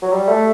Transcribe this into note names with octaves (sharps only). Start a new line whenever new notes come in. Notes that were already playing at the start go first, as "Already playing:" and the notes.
F#3
G3
A3